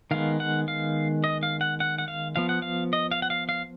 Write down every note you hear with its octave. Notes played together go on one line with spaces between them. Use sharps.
D#3 G#3 B3 F5
F#5
F5
D#5
F5
F#5
F#5
F#5
F5
F3 B3 F5
F#5
F5
D#5
F5
F#5
F5
F5